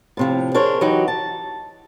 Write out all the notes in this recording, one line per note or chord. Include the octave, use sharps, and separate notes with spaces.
A2 C3 F3
D4 G#4 A#4 C5 C#5
E3 F#3 D#4 F#4 G4
A5